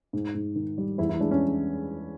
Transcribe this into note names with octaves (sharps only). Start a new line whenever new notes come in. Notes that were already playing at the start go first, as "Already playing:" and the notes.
G#2
G#2
D#3
G3
E2 E4
E4
G#3 D4
C#4